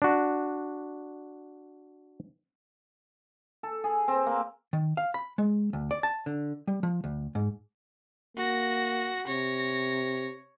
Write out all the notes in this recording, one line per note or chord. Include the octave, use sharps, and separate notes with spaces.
D4 F#4
A4
G#4
C4
A#3
D#3
F5
B5
G#3
D2
D5
A5
D3
G3
F3
D2
G#2
A#3 F#4 A#6
C3 C#5 A#6